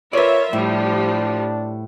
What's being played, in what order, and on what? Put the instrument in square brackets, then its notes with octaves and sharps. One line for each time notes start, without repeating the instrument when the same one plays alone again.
[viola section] F4 A#4 E5 [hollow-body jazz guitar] B4 D5 [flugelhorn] C#5
[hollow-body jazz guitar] A2 [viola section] F3 G3 [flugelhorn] D4